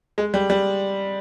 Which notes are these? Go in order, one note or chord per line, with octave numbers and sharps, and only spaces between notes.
G#3
G3
G3